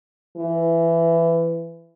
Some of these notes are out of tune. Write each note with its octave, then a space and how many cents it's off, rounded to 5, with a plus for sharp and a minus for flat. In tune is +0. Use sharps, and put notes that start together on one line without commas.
E3 +15